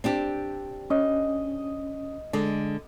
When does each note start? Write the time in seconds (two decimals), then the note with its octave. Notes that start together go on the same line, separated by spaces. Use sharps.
0.04 C4 D4 G4
0.90 C#4 D#5
2.33 D3 G#3 D6